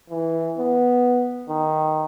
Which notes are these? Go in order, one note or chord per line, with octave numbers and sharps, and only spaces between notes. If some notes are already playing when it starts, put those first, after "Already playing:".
E3
B3
D#3